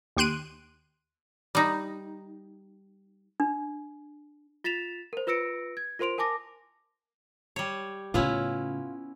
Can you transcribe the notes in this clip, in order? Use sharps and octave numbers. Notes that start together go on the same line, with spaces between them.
D#2 G4 C6 F#6 D7 D#7
G3 D#4
D4
F4 A6 B6 E7 F7
A#4 C5
F4 B4 E6 A#6 C#7 D7
G#6
F4 A#4 C5 C6 D7 F7
A#4 G#5 A5 D6 A#6
G3 C#5
A2 C#3 B3 C#4 E4 F4